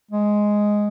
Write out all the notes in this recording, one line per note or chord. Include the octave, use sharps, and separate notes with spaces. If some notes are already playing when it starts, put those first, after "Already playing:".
G#3